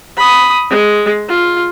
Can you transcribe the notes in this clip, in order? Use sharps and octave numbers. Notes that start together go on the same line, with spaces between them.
B5 D#6
G#3
F4